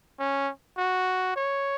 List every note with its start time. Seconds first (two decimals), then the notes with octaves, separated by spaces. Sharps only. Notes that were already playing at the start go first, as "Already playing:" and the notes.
0.19 C#4
0.78 F#4
1.36 C#5